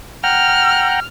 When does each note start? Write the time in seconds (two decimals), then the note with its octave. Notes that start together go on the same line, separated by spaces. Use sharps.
0.24 F#5 G5 A#5 F6